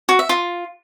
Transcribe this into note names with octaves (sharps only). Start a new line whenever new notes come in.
F#4
E5
F4